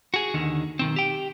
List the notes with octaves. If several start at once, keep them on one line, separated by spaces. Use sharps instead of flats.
F#4 G#4
D#2 D3 D#3
B1 D#3 C4
G4 G5